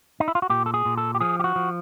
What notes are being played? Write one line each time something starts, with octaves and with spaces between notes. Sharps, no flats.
D#4
E4
F4
F#4
A#2 G4
A4
G#4
A#2
A4
G4
F3 G#4
G4
F#4
F3